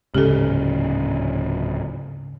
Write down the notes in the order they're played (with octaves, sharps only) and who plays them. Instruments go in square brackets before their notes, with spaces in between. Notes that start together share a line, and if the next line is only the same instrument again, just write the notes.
[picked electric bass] D1 C#4 [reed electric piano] G#2 C#3 [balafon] G4 A4